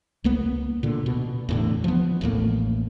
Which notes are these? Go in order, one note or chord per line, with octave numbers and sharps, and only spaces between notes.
C#2 A#3 B3
A#2 D3
B2
E2 A2 D3
F3 B3
A1 D#2 A2 A#3